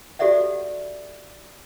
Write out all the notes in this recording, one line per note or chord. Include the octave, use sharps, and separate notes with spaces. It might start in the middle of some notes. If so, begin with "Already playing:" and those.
F#4 G4 A4 D5 E5 F#5